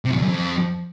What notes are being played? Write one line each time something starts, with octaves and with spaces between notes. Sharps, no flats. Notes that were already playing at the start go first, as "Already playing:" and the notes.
C3
F#2
E2
F#2
F2